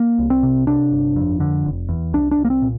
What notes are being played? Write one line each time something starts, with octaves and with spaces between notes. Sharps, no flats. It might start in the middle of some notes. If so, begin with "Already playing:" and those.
Already playing: A#3
C2
C4
C3
C3 D4
G1
F2
D3
F1
E2
C2 D4
D4
C2
A#3
C4
A#2